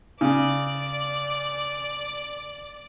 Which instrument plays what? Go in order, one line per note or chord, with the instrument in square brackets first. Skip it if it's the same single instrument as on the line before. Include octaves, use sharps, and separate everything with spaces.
[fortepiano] C#3 [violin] D5